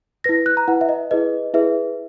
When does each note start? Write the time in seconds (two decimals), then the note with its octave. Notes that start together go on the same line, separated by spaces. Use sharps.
0.24 E4 B4 A#6
0.46 F#6
0.57 A#5
0.68 E4 B4 F#5
0.81 E5
0.89 D#5
1.11 E4 G#4 B4 D#5
1.54 E4 G#4 B4 E5